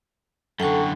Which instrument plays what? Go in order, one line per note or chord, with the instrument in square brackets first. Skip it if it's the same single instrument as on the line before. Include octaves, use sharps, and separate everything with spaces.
[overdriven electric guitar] F#2 D3 [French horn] A4 [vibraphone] F#5 G5 C#6